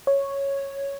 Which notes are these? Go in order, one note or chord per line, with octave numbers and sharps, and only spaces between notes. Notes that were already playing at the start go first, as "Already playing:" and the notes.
C#5